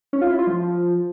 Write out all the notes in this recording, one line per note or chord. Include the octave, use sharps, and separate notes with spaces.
C#4
F4
E4
F4
F3